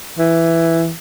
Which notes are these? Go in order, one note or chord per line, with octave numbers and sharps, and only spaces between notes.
E3